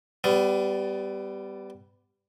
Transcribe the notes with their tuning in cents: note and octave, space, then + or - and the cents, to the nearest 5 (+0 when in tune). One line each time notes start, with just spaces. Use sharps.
G3 -5 B3 +25